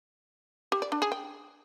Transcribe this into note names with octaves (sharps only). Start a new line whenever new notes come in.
G4
D5
D4
G#4
G5